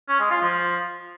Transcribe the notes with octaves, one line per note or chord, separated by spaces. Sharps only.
C#4
G#3
F4
F3